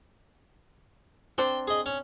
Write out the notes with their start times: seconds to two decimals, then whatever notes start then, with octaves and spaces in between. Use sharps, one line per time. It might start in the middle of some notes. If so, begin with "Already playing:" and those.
1.38 C4 D4 C5 G5
1.68 G#4 D#5
1.86 C#4